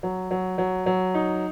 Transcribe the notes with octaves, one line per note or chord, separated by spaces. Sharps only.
F#3
F#3
F#3
F#3
D#4